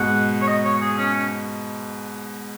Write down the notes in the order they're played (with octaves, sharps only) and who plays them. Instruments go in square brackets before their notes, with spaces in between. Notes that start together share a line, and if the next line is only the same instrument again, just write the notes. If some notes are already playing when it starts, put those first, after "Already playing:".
Already playing: [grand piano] G#2 B2 [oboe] F#5
[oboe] C#5
D#5
C#5
G#4
C#4
C#4